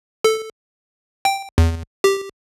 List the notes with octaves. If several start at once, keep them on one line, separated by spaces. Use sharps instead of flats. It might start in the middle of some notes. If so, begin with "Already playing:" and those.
A4
G5
E2
G4